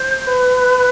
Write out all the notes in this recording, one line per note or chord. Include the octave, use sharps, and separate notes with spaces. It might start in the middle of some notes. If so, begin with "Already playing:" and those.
Already playing: C5
B4